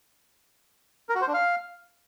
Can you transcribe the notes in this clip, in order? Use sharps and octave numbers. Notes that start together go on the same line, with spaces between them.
A#4
F#4
C5
D4
F5